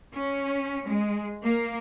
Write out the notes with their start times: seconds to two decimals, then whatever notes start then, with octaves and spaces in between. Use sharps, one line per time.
0.15 C#4
0.89 G#3
1.43 A#3